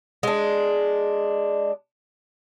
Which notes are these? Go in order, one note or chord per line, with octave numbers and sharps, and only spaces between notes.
G#3 D4